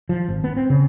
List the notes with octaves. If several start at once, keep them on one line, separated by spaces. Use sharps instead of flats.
F3
G#1
B3
C4
C#3